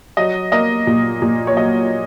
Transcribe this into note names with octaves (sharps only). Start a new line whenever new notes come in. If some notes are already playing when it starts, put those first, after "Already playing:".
F#3 D#5
A#3 D#5
A#2
A#2
C#5
F#3 D#5